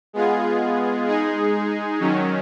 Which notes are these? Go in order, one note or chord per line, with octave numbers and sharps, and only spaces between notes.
G#3 B3 F4 G#4
G#3 D#4 G#4
D#3 F#3 C#4